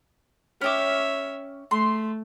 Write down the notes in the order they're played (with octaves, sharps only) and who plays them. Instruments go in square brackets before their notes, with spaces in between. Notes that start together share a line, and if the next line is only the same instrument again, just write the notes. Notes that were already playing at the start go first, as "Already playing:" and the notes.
[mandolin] C#4 G5 D6 [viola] C#5 E5
[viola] A3 [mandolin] C6